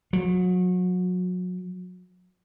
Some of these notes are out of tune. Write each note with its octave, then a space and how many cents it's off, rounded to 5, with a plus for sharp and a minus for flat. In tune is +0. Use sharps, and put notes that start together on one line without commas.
F#3 -30